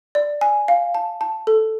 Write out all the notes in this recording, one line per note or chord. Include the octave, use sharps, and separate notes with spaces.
D5
G#5
F5
A5
A5
A4